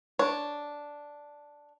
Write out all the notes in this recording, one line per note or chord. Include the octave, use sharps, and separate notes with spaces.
D4 C#5